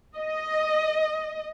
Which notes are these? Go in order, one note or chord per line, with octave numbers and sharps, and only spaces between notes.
D#5